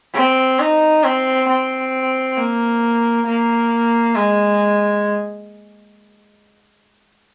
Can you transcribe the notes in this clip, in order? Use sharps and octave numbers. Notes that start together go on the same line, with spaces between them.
C4
D#4
C4
C4
A#3
A#3
G#3